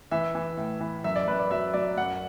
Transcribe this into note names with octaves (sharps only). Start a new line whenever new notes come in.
E3 E5
E3
A2
E3
F#2 E5
D5
F#2 B4
D5
F#3 E5
F#3 D5
F#2 F#5